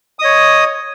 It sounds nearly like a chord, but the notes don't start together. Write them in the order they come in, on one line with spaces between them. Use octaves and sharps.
D#6 D#5 C#5